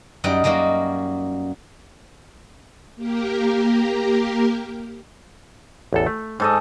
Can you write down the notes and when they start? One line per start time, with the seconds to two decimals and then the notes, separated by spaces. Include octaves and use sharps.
0.24 F#2 G3 D#4 F#5 G5
0.44 F#2 G3 A#3 D#4 F#4
2.96 A#3 G4 A#4
5.93 A1 E2 A4
6.07 A3
6.40 G#2 A4 D#5